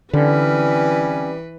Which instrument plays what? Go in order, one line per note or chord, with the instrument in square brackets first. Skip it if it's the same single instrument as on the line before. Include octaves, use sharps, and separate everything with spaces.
[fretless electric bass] D3 [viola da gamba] E3 B4 [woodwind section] G3 C4 C#4